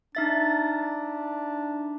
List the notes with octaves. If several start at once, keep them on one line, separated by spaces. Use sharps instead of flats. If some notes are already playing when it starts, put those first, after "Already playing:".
D4 D#4 E5 A6